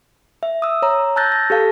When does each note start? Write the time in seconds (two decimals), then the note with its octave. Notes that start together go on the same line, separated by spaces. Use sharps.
0.43 E5
0.62 D#6 E6
0.82 C#5 A#5
1.16 A5 E6 F#6 G6 A6 A#6
1.32 A#6
1.50 G4 A4 F5 A5